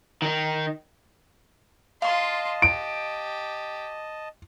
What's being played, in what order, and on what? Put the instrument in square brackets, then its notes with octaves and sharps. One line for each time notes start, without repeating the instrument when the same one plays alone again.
[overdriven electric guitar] D#3 D#4
[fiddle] F4 C6 [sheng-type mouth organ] D#5 A5 [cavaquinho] F5 C#6
[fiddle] G4 [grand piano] D7